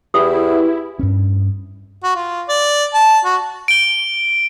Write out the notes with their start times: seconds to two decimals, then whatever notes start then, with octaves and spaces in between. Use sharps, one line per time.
0.14 E2 E4 G4 B4 D#6
0.99 G2 C#4
2.03 F#4
2.15 F4
2.49 D5
2.94 A5
3.25 F#4
3.68 D7 G7